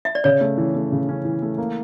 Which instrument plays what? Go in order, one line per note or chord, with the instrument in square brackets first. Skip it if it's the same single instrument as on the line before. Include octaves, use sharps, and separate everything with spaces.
[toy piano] E5
D5
[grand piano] C#3 [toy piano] C#5
[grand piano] A3
E3
A3
C#3
C#4
E3
A3
A#3